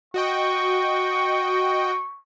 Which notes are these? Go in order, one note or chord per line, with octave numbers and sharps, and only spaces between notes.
F#4 D#5 G5 C#6